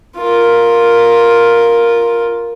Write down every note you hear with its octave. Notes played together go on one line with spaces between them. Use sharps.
F4 A#4